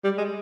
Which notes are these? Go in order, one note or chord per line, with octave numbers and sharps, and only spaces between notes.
G3
G#3